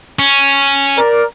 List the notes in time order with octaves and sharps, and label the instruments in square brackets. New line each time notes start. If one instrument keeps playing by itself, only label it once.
[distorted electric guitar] C#4
[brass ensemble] A#4 D5